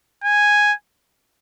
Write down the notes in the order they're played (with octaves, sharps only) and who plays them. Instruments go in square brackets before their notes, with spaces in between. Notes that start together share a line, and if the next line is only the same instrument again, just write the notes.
[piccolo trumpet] G#5